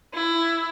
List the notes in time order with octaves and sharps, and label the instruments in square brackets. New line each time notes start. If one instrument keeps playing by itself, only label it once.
[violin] E4